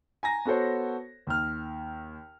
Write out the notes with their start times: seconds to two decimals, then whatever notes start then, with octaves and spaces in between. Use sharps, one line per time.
0.23 G#5 A#5 A#6
0.45 B3 F#4 A4 C5 C#5
1.27 D#2 F6